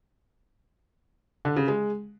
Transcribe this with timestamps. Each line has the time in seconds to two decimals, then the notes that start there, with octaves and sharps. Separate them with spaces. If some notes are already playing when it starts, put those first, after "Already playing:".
1.45 D3
1.56 C#3
1.68 G#3